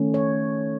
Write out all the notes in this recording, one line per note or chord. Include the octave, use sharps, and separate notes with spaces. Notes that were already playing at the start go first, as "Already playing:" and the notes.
Already playing: D#3 A3 C#4
C#5